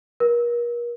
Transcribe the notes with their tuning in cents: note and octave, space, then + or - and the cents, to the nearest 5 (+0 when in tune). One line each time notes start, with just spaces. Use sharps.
A#4 +40